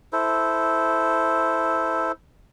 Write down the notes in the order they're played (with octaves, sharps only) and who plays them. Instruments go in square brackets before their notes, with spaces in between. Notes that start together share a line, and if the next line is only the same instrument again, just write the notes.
[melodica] E4 A4 C5